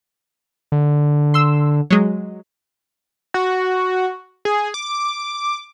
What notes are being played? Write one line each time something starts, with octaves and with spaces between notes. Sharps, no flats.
D3
C6 E6
F#3 G#3
F#4
G#4
D6